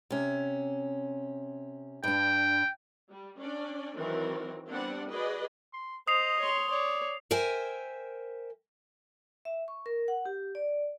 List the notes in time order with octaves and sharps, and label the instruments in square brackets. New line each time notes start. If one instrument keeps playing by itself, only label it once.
[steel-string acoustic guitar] C3 C#4
[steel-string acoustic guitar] G2 D4 [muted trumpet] G5
[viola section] G3
C#4 D4 D5
D#3 E3 F#3 C4 A#4
G3 B3 C4 D4 D5 F#5
F#4 G#4 B4 D5 D#5
[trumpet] C6
[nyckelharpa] C5 [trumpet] D#5 [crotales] D#6 C7 F7
[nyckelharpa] C#5 C6
[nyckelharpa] C#5 [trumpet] D5
[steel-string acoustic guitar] A#4 C5 E5 G5 G#5
[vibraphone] E5
C#6
A#4
F#5
G4
D5